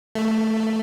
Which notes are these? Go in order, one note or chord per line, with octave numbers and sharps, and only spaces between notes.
A3